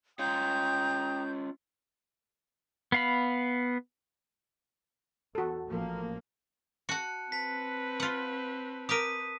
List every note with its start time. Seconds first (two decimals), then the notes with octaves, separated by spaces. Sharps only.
0.19 C#4 F4 G5 A#5 D#6 G6
2.92 B3 F5 B5
5.35 E2 F#4 A4
5.68 A1 F3 A#3
6.89 F#4 F#5 A5 F#6 C#7
7.32 C4 B4 A5 B6
8.00 F4 F#5
8.89 G4 A#4 D#6 B6 D#7